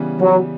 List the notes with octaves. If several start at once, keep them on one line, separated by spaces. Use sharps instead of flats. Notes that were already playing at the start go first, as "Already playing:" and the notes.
Already playing: C#3 E3 G3 B3
F#3